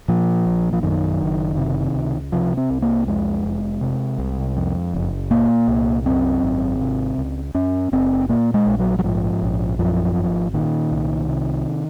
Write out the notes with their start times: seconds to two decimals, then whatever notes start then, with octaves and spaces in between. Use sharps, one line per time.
0.08 A#2 F3
0.46 A#1
0.73 F3
0.83 F#2 D#3
1.21 F#1
1.58 C3
1.95 C#2
2.32 C3 F3
2.57 C4
2.70 C2
2.82 A#3
3.07 F2 G#3
3.45 F1
3.81 C3
4.18 C2
4.57 F2
4.94 F#1
5.31 A#2 A#3
5.68 C2
6.05 F#2 C4
6.43 G#1
6.81 C3
7.18 C#2
7.55 F#2 C#4
7.92 F#1 C4
8.29 A#2 A#3
8.54 G#3
8.67 A#1
8.79 F#3
8.99 F#3
9.04 G#2 F3
9.42 A#1
9.79 F#2 F3
10.17 G#1
10.54 A#2 D#3
10.92 C2
11.28 C3